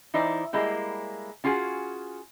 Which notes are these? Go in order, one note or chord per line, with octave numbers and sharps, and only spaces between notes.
E3 D#4 E4 C5 D5
G3 G#3 A#3 E4 G4
C#4 F4 F#4 G#4